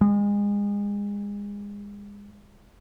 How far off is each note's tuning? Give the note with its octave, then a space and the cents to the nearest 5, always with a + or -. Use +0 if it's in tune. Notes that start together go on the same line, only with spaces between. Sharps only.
G#3 -30